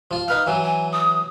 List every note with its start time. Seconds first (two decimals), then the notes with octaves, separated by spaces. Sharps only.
0.11 F3 F4
0.28 D#4 B4 F5 F6
0.47 E3 F#3 G#5
0.63 G#5
0.92 D#6